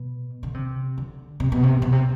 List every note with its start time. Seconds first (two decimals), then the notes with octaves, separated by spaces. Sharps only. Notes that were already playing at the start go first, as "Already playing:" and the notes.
Already playing: B2
0.43 D3
0.54 C3
0.98 D3
1.40 C3
1.52 B2
1.63 C3
1.82 B2
1.92 C3